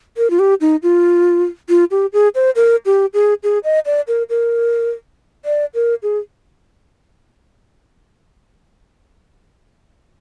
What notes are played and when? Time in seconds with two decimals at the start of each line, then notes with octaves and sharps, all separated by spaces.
0.17 A#4
0.30 F4
0.39 G4
0.61 D#4
0.83 F4
1.69 F4
1.91 G4
2.13 G#4
2.35 C5
2.56 A#4
2.86 G4
3.14 G#4
3.43 G#4
3.64 D#5
3.86 D5
4.08 A#4
4.30 A#4
5.45 D5
5.74 A#4
6.03 G#4